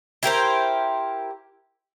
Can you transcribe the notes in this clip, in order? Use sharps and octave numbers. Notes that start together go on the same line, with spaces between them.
E4 G4 A#4 C5